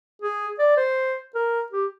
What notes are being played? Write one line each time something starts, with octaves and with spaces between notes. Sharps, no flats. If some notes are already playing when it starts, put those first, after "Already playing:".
G#4
D5
C5
A#4
G4